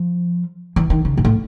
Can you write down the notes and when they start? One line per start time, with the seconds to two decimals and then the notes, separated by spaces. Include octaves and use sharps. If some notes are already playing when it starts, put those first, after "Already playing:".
Already playing: F3
0.76 E3
0.90 D#3
1.05 C#3
1.17 G#2
1.25 A2